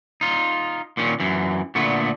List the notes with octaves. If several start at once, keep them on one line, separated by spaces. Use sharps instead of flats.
D#4 F4
A#2 D#3 C#4
F#2 E3
A#2 D3 A3 B3